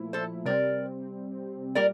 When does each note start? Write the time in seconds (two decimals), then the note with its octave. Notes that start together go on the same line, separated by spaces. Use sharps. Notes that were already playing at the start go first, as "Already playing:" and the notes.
Already playing: A#2 F3 A3 E4
0.13 A4 C5
0.45 C3 G3 C4 A#4 D5
1.75 A#2 G3 A#4 D5